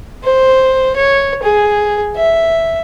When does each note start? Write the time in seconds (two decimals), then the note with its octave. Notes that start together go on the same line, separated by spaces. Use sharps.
0.24 C5
0.96 C#5
1.43 G#4
2.16 E5